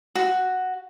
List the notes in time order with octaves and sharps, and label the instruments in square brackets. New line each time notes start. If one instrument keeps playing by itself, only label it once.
[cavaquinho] F#4